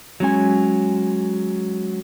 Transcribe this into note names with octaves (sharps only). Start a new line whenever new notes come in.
F#3 G#3 C#4 G#5